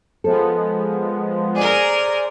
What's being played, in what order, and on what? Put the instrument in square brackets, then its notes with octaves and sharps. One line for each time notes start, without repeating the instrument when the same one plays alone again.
[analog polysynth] F3 G#3 B3 [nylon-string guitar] A4
[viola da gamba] G#4 A#4 [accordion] C5 D5 G#5